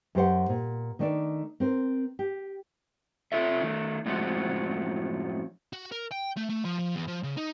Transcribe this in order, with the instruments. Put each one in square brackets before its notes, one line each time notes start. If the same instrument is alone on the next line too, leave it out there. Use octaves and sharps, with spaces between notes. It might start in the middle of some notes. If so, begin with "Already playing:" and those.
[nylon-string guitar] F#2 G4 C5 F#5
A#2
D#3 A3 D4 A4 D5
C4 A#4 C5
G4
[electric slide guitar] C3 F4 A4 E5
D#3 A3
F#2 A2 F3 G#3 C4 F#4
[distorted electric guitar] F#4
A#4
G5
A3
A3
F3
F3
E2
F3
C#3
D#4